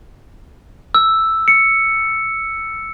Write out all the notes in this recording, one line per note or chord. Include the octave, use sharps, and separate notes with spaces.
E6
C#7